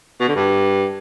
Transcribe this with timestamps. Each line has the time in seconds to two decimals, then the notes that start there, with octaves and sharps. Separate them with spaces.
0.20 B2
0.28 D3
0.36 G2